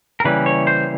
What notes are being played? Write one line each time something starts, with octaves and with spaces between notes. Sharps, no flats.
A#4
C#3 E3 G3 A#3 C#4 B4
C#5
C5